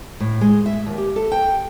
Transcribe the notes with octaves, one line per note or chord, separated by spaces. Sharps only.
A2
G#3
E5
D#2
G4
A4
G5